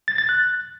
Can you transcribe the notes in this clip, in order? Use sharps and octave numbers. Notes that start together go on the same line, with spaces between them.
A6
A6
F#6